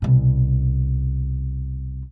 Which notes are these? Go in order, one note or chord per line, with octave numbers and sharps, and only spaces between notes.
C2 B2